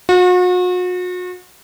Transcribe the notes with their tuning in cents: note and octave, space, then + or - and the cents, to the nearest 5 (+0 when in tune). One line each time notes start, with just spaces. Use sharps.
F#4 -40